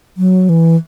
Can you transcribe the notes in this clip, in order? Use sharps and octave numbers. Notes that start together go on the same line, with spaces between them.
F#3
E3